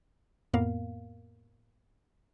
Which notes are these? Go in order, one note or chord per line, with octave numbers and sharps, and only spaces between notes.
F2 A2 A#3 B3 A#4 F5